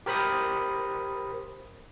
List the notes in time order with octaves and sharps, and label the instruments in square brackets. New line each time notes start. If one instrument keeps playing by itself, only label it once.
[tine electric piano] G4 A#4 C5 B5 D#6